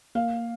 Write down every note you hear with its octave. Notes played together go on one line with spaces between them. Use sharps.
A#3 F5